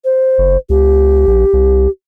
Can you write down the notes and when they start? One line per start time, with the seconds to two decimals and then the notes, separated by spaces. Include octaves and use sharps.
0.05 C5
0.38 F#1
0.70 C#2 G4
1.27 A#1
1.53 C2